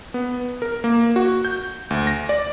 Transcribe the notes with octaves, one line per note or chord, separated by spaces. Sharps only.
B3
A#4
A#3
F#4
G6
D2
A#6
D5